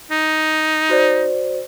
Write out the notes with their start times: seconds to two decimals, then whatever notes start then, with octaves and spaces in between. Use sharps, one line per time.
0.11 D#4
0.89 F#4 C5 D5